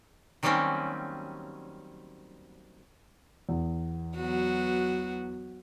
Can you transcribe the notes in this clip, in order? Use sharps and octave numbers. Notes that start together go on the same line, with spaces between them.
D#3 F#3 G3 A#3 C4 C#4
E2
F#3 B3 F#4